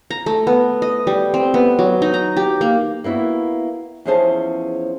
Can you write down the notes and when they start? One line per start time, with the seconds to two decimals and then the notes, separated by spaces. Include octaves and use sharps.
0.10 A#5
0.26 A3
0.47 B3
0.82 D#5
1.07 G3
1.34 C4
1.54 B3
1.79 F#3
2.02 D#4
2.14 A#5
2.37 G4
2.61 A#3
3.04 A#3 B3 E4 F#4
4.05 E2 F3 C#4 G#4 C5 A5